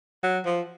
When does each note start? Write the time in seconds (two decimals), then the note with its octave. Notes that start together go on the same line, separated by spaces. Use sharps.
0.23 F#3
0.45 F3